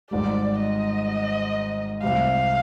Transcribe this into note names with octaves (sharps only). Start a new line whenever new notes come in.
G#1 G#2 G3 D5
D#5
C2 C3 G3 F5